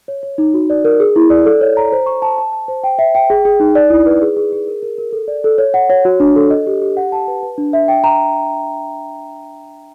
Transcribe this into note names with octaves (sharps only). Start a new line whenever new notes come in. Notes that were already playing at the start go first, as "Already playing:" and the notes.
C#5
C#5
D#4
F#4
D5
A#4
G#4
E4
D5
A4
C#5
A#5
C5
C#6
A5
A5
A5
C5
G5
E5
G5
G#4
G#4
D#4
D5
E4
B4
G#4
G#4
G#4
A#4
A#4
A#4
A4
D5
A4
C#5
F#5
C#5
F#4
D4
A4
D#5
G4
G4
F#5
A5
B4
B4
D4
E5
G5
A#5